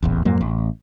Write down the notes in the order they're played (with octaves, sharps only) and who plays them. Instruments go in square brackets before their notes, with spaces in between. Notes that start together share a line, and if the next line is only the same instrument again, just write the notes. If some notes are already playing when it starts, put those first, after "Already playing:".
[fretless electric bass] D#1 A1 E2
F2 G#2 F#3 A#3
A1